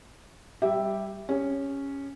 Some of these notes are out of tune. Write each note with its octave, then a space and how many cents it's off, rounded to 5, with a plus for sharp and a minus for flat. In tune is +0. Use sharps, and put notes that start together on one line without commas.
G3 +0 G4 +0 E5 +0
C#4 +0 G4 +40